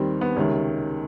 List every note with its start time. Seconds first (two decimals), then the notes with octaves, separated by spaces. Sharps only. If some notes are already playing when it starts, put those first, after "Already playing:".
Already playing: D#2 D#3 G3 C4
0.21 B3
0.36 C#2 C3 D#3 C#4